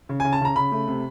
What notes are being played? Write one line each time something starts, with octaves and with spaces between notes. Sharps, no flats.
C#3
C#3 G#5
A5
C#3 A#5
C#3 B5
A3
C3